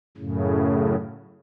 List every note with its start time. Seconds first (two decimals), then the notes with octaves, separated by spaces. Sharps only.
0.17 F#2 A2 C#3